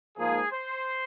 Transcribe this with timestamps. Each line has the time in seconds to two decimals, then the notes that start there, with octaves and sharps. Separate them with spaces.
0.17 G#2 F3 A#3 G#4
0.50 C5